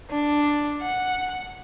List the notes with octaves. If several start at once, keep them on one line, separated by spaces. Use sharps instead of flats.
D4
F#5